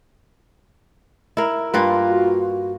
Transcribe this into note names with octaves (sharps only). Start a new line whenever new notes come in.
E4 A#4
G2 A#3 F4 B4 C6
F#4